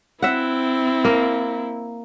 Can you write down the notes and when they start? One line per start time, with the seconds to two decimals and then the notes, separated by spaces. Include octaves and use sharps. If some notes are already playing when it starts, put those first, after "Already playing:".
0.22 C4 E4 E5 F#5
1.05 A#3